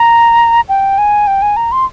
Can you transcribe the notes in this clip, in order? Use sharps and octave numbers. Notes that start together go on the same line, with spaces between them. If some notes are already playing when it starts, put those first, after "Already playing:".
Already playing: A#5
G5
G#5
G5
G#5
A#5
C6